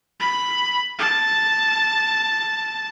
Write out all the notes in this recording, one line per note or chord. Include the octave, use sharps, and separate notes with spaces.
B5
A5